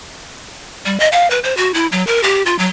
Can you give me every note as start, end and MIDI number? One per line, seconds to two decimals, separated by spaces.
0.86 0.99 55
1.00 1.08 75
1.12 1.29 77
1.30 1.39 71
1.44 1.56 72
1.57 1.74 66
1.74 1.87 64
1.92 2.05 54
2.07 2.22 70
2.23 2.43 67
2.46 2.58 65
2.59 2.67 54